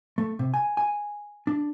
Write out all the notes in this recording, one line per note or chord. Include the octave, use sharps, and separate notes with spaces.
A3
C3
G#5
G#5
D4